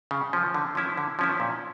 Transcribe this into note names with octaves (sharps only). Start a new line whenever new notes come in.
C#3
F3 C#4
D3
F3 C#4 E4
D3
F3 C#4 E4
A#2